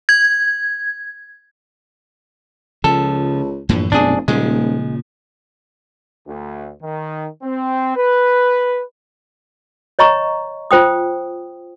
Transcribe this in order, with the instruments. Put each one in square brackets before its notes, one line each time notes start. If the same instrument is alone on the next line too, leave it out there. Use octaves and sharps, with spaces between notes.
[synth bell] G#6
[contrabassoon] C#2 [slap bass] C#3 F3 [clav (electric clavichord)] A4
[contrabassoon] A#1 [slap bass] F#2 A2 E3
[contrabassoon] F1 [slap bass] F#2 B2 B3 [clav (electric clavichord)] D4 G#4
[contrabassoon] D#1 [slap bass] A#2 C#3 F3 [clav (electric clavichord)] G#3
[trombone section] D2
D#3
C4
B4
[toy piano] C#5 D#5 A#5 C#6
F4 C5 G5 D#6